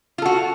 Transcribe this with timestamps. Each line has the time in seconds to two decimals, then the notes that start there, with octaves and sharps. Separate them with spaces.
0.18 F4
0.22 A4
0.26 F#4